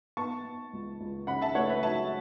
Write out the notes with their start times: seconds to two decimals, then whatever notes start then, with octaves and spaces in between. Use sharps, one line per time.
0.17 B3 A5 C#6
0.44 B3
0.73 C#2
1.01 C#2
1.27 C#3 F#5 B5
1.41 E5 A5
1.55 A3 C#5 F#5
1.69 B4 E5
1.83 F#3 E5 A5